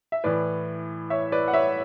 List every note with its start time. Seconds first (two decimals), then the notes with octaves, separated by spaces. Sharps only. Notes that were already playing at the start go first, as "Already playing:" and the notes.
0.12 E5
0.24 A2 E3 B4 D5
1.10 C#5 E5
1.32 B4 D5
1.48 F#5
1.53 C#5 E5